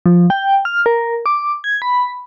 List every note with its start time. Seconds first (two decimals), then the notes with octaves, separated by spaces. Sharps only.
0.06 F3
0.30 G5
0.65 F6
0.86 A#4
1.26 D6
1.64 G#6
1.82 B5